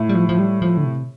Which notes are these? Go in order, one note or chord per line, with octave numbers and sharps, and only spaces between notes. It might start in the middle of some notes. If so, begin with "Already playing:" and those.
Already playing: A2
G3
F3
F3
G3
F3
D3
C3